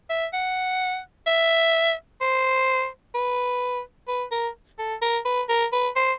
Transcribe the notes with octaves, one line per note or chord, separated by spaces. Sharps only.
E5
F#5
E5
C5
B4
B4
A#4
A4
A#4
B4
A#4
B4
C5